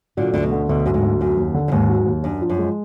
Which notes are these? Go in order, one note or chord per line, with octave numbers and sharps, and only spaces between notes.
A#2 D3 F#3
D2 D3
B2
D3
D2 B2
F#2 F#3
G#2
D2
F#2 F#3
D#2
D3
F#2
D#2 G#2
F#3
D#2
F#2 D4
F3
F#2
G#3